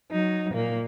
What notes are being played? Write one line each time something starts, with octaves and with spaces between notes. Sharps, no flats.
F#3 D#4
A#2 A#3